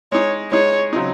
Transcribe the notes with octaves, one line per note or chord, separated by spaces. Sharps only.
G#3 D#4 G#4 C#5
G#3 D#4 G#4 C#5
C#3 F#3 C4 D#4